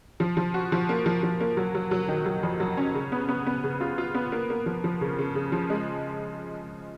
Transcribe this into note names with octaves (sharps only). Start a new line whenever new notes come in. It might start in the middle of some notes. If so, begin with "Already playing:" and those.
F3
F3
F#4
F3
A#3
F3
F3
A#3
F#3
F#3
F#3
D#3
F#3
F2
F#3
C#4
C#3
B3
B3
B3
C#3
F4
F4
B3
A#3
A#3
F3
F3
C#3
C#3
C#3
F3
G#3